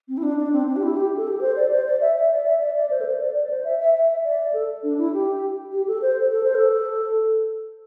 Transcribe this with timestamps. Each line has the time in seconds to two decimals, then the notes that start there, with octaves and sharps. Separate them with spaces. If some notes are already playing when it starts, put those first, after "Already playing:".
0.08 C4
0.17 E4
0.23 D4
0.38 D4
0.52 C4
0.67 D4
0.76 G4
0.83 E4
0.97 G4
1.17 A4
1.28 G4
1.38 A4
1.41 C5
1.56 D5
1.72 C5
1.86 D5
2.01 E5
2.16 E5
2.31 D5
2.45 E5
2.61 D5
2.76 D5
2.90 C5
3.01 A4
3.05 C5
3.20 D5
3.34 D5
3.50 C5
3.64 E5
3.80 E5
3.94 E5
4.24 D5
4.54 A4
4.83 D4
4.98 E4
5.13 G4
5.72 G4
5.88 A4
6.02 C5
6.31 A4
6.43 C5
6.55 A4